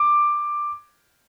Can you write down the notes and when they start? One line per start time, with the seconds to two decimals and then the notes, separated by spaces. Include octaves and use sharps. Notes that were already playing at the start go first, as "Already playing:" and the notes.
Already playing: D6